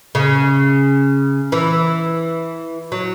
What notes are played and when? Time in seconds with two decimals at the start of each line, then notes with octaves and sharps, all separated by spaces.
0.15 C#3
1.52 E3
2.92 F#3